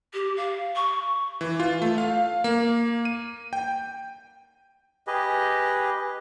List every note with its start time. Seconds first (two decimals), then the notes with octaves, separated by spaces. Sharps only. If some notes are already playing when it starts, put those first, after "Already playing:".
0.13 G4
0.37 F5
0.76 C#6
1.41 E3
1.60 F4
1.82 A3
1.98 F5
2.44 A#3
3.05 D#7
3.53 G5
5.07 G4 G#4 B4 D#5